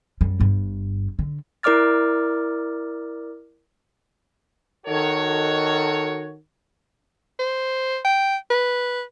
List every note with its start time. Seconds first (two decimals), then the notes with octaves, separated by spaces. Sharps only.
0.21 F#2 G3
0.40 G1 G2
1.19 D3
1.63 E4 A#4 D5 D6 F6 A6
4.87 D#3 F#4 A4 C#5
7.39 C5
8.05 G5
8.51 B4